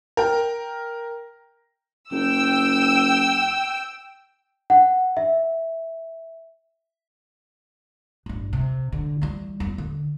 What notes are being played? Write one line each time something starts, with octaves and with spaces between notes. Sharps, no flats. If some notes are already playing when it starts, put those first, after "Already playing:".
A#4 G5 A#5
F#1 G5 E6
F#5
E5
A1 G2
C3
D3
E3 G3
E2
D3